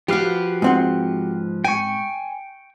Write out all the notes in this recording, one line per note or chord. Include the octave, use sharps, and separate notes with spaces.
F3 F#4 G4 B4 F5
G#2 C4 F#5
G5 G#5 C#6